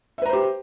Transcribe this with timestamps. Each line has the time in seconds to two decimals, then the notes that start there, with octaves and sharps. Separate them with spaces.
0.18 E5
0.22 B4
0.26 A#5
0.29 C5
0.33 G4